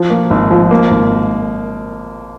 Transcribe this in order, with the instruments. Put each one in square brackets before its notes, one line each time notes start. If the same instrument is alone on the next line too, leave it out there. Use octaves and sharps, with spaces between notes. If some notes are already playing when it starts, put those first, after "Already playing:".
Already playing: [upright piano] F3
A#3
G#1
F3
A#3
G#1